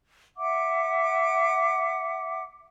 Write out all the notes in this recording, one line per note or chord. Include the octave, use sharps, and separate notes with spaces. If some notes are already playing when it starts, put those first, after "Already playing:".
E5 F#5 D6